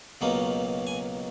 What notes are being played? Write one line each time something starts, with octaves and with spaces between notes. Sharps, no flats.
C#2 B2 F#3 A#3 D#4
G#5